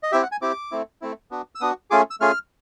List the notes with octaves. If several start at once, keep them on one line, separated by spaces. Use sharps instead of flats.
D#5
C4 E4 G4 E5
F#5
G#5
C4 E4 G4 D6
A3 C4 E4
A3 C4 E4
B3 D4 F#4
E6
B3 D4 F#4 D#6
A3 C#4 F4 G#4 D6
E6
A3 C#4 F4 G#4 F6